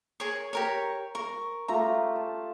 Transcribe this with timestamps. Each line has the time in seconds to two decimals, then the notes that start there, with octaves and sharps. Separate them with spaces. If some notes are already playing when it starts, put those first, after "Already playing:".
0.20 G#4 A#4 C#5
0.53 G4 A#4 C#5
1.15 A#4 C#6
1.68 A3 F4 G4 A#5
2.16 A5